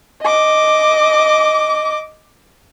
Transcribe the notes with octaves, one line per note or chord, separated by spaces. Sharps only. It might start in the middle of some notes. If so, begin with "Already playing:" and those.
D#5 D6